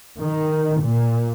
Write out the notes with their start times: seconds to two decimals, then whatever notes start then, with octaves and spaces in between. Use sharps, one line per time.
0.20 D#3
0.81 A#2